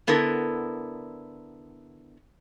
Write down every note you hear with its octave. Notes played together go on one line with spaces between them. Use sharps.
D3 B3 E4 A4 A#4